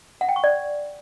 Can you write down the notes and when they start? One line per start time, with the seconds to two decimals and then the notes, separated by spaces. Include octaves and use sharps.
0.21 F#5
0.29 G5
0.36 C#6
0.44 D5